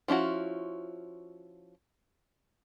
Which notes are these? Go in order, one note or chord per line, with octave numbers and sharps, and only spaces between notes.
F3 C#4 E4 F#4